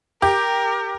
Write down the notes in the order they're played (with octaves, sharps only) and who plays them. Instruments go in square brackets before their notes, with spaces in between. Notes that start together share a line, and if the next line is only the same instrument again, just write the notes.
[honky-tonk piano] G4 [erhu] A#4